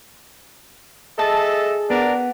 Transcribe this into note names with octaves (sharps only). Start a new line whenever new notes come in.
G#4 A4 D#5 E5 A5
B3 D4 A#4 D5